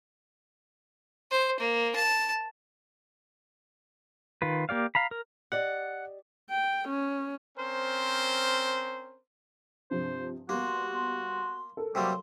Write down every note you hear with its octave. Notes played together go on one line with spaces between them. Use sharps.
C5
A#3
A5
D#3 F4 B4
A#3 G4 D5 F5
F5 A#5 B5
A#4
G4 D5 D#5 F#5
G5
C#4
C4 C#4 A#4 C5
G2 C3 F3 C5
G3 A#3 B3 F#4 C6
C6
A4 A#4
C3 F#3 G3 A#3 C6